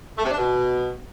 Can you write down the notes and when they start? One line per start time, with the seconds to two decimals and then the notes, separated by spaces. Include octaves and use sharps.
0.17 A3
0.24 C3
0.31 D4
0.38 B2